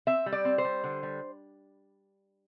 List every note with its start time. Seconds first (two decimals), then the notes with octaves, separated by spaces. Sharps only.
0.07 C4 E5
0.26 G3
0.32 D5
0.45 C4
0.58 C5
0.64 G3
0.84 D3
1.03 G3